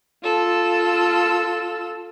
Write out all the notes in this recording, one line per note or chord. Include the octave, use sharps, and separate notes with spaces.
F4 A4 E6